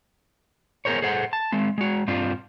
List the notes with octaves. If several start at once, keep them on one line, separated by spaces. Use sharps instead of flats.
B3 G#4 A#4 C5 C#5
G#4 A4 C5 F#5
A5
G#3 C4
G#3 F#4
G2 C4 D4 F4